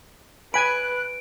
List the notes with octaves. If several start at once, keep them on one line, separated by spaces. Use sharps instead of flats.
B4 G#5 B5 F#6 D7